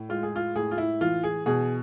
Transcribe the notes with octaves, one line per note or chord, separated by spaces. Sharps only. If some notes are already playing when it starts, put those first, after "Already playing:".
Already playing: A2
G#3 F4
G#4
F4
A2 G#4
F4
E4
E3 F4
G#4
B2 G#4